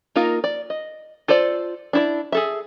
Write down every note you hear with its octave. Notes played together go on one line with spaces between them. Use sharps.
A#3 D#4 F4 A#4
D5
D#5
F4 A4 C5 D5
D4 E4 D5
G#4 A4 E5